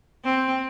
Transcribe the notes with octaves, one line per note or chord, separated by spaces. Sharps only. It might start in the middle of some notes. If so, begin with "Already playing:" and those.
C4